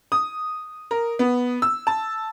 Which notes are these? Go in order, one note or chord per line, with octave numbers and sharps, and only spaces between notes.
D#6
A#4
B3
E6
A5